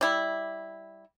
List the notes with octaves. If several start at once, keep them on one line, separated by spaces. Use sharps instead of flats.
G3 E4